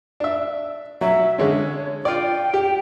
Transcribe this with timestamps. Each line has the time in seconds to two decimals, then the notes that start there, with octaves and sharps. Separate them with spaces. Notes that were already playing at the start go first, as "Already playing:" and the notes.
0.20 D4 E5
1.01 F#3 E5
1.38 D3 G#3 C#4 C#5
2.05 F4 D5 G5
2.54 G4